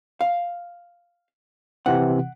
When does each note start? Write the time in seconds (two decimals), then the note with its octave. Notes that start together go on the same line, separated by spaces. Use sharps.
0.21 F5
1.86 C3 E3 C4 F#5